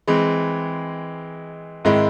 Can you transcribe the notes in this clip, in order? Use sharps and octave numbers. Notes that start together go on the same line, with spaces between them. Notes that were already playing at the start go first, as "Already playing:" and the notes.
E3 G#3 C4
G#2 D#3 G#3 C4 E4